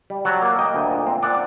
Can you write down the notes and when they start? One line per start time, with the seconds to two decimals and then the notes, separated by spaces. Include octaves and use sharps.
0.10 G3
0.25 F#3 F#5 A5
0.42 A#3
0.59 A#3 D#5 G5
0.74 D2
0.91 A#2
1.07 C4
1.23 A#2 D5 F#5